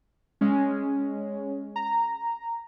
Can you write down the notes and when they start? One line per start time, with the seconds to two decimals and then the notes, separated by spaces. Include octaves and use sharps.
0.41 G#3 C#4
1.76 A#5